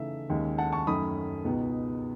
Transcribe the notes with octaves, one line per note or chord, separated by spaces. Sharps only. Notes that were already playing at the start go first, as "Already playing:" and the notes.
Already playing: C#3 E3 A3 D#4 E5
D#2 D#3 G#3 C#4
F#5 A5
A5 C#6
F#2 D#3 A3 C#4 B5 D#6
C#2 B2 G#3 B3 D#4